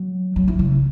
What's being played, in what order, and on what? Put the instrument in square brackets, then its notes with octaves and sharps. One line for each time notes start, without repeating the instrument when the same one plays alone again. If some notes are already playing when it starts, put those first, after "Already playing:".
Already playing: [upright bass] F#3
F#3
E3
C#3